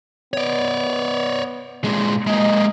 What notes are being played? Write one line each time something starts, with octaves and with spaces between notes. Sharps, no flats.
B3 C#5 D5
A#2 G#3
G#3 A#3 D#5